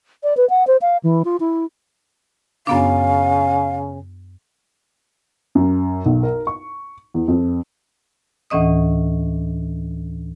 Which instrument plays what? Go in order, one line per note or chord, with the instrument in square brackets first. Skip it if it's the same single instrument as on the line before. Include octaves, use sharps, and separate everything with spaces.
[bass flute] D5
B4
F#5
C5
F5
E3
F4
E4
[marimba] F#2 B3 D4 [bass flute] C#3 [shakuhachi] F5
[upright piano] F#2
B1
A#4
C#6
E2
F2
[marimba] D2 A2 E3 C#4 D#5 D#6